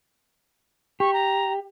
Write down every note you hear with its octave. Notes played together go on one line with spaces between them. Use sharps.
G4 C#6
A#5